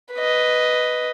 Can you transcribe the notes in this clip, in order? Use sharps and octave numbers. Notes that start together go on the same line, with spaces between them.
B4 D#5